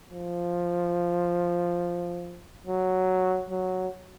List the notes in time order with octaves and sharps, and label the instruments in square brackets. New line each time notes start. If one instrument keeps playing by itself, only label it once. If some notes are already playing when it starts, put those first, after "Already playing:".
[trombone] F3
F#3
F#3